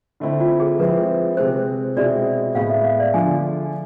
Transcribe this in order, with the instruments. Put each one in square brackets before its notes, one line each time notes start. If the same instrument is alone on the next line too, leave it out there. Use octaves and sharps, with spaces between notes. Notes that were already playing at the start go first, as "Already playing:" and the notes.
[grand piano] D3 A3 C4 E4
[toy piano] F4
G#4
[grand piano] F3 G#3 C4 E4 [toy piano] B4
[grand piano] C3 G#3 C4 [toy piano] C5
[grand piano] B2 G#3 C4 E4 [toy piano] D5
[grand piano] A2 G#3 B3 E4 [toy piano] F5
[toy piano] E5
F5
D5
[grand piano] D3 F3 A3 D4 [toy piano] G#5